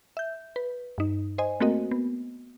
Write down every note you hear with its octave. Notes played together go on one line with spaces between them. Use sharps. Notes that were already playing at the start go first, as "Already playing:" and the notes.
E5 G6
B4
G2 D#4
C5 D#5 G#5
A3 A#3 C4 F#4 A#4 D#5
B3